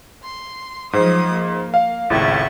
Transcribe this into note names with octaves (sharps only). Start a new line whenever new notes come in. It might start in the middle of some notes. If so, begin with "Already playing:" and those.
C6
G#2 F3 F#3 C5 D#6
A#3
F5
G#1 C#2 A2 E5 F#5 C#6